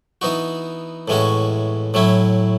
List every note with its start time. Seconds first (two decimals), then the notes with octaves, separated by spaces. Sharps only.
0.21 E3 B3 D#4 F#4
1.08 A2 E3 G#3 C#4 F#4
1.94 A2 F#3 C#4 E4